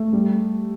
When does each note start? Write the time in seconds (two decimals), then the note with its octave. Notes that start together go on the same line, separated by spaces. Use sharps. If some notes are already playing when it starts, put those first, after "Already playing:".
Already playing: A3
0.13 G3